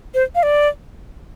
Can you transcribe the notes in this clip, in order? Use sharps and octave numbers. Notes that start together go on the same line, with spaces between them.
C5
F5
D5